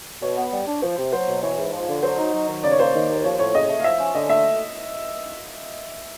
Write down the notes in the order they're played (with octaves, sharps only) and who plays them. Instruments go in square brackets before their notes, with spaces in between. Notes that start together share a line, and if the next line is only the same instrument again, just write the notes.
[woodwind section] B2 [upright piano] C#5
[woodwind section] B3
G3
D4
[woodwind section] F3 [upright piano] C5
[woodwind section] C3
[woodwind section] F#3 [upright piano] C5
[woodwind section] B2
[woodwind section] E3 [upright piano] C#5
[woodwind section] G#2
F3
D3
[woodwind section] F#3 [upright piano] C5
[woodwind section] D#4
F#3
D#3
[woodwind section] C#3 [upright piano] D5
[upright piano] C#5
[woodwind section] A#3 [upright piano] C5
[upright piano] C#5
[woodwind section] D#3
D#2
[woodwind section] F3 [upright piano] C#5
[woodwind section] A2 [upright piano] C#5
[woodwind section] C#3 [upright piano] D#5
[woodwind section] A3
[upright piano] F5
[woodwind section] F3 [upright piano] E5
[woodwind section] C#4
[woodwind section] D3 [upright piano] D#5
[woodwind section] A3 [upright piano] E5